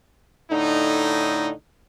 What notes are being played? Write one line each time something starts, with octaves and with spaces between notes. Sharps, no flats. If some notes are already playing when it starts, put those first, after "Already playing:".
A2 D3 D#4